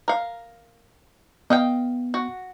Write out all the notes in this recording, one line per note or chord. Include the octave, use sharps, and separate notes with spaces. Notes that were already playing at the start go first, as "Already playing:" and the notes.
A#4 F5
B3 D#5 F5 G5
F#4